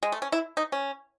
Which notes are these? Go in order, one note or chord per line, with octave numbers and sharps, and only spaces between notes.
G#3
A3
C#4
E4
D#4
C#4